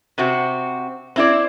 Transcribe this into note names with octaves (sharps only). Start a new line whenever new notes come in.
C3 C4 F#4
C4 E4 D5